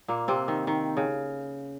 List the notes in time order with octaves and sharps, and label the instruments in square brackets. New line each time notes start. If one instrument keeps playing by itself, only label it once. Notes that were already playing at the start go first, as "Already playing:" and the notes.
[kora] A#2 A#3
C3 C4
D#3
D#3
C#3